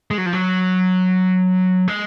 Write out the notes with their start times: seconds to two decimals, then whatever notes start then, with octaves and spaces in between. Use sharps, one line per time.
0.11 G#3
0.18 F#3
0.26 F3
0.33 F#3
1.88 G#3